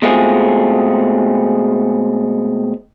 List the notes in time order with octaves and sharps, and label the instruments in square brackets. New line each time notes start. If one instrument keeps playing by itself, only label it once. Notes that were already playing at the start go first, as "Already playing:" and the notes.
[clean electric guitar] B2 G#3 A3 C4 F4 G#4